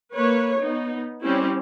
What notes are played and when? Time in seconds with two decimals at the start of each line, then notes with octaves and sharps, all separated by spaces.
0.14 A#3 B4 C#5
0.60 B3 D#4
1.21 G3 C4 C#4 E4 G4